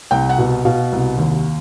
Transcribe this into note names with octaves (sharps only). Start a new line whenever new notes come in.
C2 G5
F#5
B2
B2 F5
C2
D#2